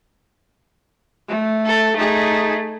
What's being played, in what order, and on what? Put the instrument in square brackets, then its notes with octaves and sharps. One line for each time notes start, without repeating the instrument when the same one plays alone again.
[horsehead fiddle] A3
[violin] A4
[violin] A3 [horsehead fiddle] D#4 G#4